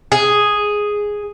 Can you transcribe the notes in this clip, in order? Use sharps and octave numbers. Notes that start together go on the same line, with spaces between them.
G#4